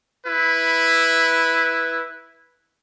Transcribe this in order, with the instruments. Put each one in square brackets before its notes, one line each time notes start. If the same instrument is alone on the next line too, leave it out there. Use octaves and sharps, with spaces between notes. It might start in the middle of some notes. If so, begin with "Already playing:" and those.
[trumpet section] E4 B4